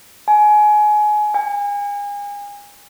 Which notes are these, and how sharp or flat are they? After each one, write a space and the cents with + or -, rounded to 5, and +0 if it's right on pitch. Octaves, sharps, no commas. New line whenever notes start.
G#5 +25
G#5 -35